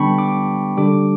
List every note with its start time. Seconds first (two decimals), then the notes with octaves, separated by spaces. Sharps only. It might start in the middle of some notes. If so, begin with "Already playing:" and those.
Already playing: D3 G3 B3 D4 G5 A5 B5 C#6
0.18 D6
0.77 D3 G3 D4 D6